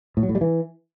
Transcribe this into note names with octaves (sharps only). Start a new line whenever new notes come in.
A2
F#3
A2
G3
E3